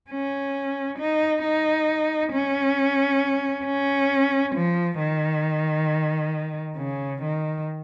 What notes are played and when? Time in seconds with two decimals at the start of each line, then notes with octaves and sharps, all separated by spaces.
0.10 C#4
0.99 D#4
1.43 D#4
2.33 C#4
3.65 C#4
4.55 F3
4.99 D#3
6.77 C#3
7.22 D#3